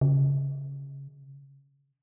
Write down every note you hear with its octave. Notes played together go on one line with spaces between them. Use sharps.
C#3